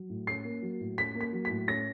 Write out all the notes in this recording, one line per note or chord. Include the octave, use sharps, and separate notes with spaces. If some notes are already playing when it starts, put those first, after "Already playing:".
Already playing: F#3
A2
C#4 C7
A#3
F#3
A2
C#4 B6
A#3
B6
F#3
B6
A2
C#4 A#6